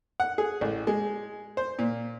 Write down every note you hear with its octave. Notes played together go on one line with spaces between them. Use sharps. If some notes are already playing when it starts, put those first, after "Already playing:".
F#5
G#4
A1
G#3
C5
A#2